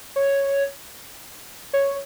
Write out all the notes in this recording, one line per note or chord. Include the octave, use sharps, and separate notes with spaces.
C#5
C#5